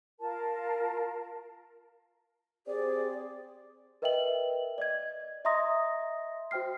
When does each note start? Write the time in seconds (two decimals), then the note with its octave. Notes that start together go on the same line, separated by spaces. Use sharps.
0.20 F4 A#4 A5
2.67 C4 G4 G#4 C5 D5
4.02 A#4 B4 D#5 E5 G5 F#7
4.78 D5 D#5 G#6
5.45 D#5 E5 A#5 C6 D#6 A#6
6.51 F#4 C5 G5 F6 C7